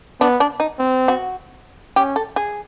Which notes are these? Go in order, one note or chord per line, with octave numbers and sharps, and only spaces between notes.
B3 D4
D4
D#4
C4
F#4
C#4 G4
A4
G#4